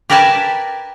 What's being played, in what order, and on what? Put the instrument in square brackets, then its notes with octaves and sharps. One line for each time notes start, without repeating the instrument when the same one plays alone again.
[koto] G4 A#4 B4 D5 G#5 A5